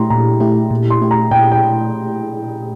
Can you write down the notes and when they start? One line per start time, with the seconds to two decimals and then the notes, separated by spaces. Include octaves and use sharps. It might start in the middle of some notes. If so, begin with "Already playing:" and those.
Already playing: A#2 A3 E4 G4 A#5 C6
0.10 A#2 A#5
0.40 A3 E4 G4
0.71 A#2
0.90 C6
1.02 A3 E4 G4
1.11 A#5
1.31 A#2 G5
1.52 G5